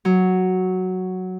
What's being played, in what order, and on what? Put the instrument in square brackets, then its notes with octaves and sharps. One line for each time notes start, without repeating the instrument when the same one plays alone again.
[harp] F#3